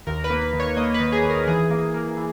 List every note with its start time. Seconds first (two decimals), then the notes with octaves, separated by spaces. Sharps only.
0.07 D#2 A#4
0.24 B4
0.30 A#3
0.42 B4
0.53 D#3
0.60 C#5
0.77 A#3 D#5
0.94 B4
1.00 D#3
1.12 G#4
1.23 D#3
1.30 A#4
1.47 E3 G#4
1.70 A#3
1.94 A#3
2.17 E3